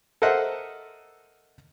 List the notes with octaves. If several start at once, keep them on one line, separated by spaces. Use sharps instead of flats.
A4 A#4 C5 D#5 E5 F#5